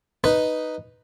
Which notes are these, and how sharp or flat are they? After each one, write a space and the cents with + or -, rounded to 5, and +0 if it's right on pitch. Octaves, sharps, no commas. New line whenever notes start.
D#4 +0 B4 +0